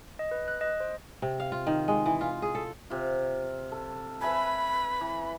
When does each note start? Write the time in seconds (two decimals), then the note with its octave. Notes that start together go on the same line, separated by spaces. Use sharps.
0.19 D#5
0.31 B4
0.48 F#6
0.61 D#5
0.80 C5
1.22 C3
1.40 F5
1.52 F4
1.67 D#3
1.88 G#3
2.06 E3
2.21 F4
2.42 G#4
2.55 A4
2.90 C3 F4
3.72 A4
4.21 B4 E5 G#5 B5
5.01 E3